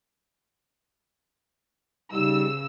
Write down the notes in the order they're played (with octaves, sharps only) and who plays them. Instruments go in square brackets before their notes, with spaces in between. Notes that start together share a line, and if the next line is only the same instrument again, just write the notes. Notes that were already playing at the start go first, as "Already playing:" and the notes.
[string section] C#3 E6 [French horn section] G3 D#4